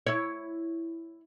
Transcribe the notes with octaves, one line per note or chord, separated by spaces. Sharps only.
E4 C#5